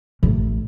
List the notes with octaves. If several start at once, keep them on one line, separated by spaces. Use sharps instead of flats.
A1